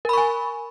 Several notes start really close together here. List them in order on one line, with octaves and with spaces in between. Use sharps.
A#4 B5 C#6 G#5